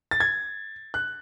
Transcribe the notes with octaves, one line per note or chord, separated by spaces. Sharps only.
A6
G#6
F#6